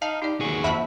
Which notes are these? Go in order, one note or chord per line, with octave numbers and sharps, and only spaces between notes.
D#4 F5 A5
D#4 G4 D5
D#2 F#4 G#4
F2 A#3 E5 F#5 A5 B5